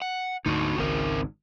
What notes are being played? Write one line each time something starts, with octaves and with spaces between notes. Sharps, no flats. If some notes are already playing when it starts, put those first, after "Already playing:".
F#5
D2 G#2 D3 D#4 F#4
G#1 C#2 G#2 C4 A#4